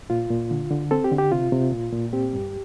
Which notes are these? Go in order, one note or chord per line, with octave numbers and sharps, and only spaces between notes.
A#2 F4
A#2
D3
D3
C4 A4
G4
D3
G4
C3 F4
C3
A#2
A#2
C4 G4
G2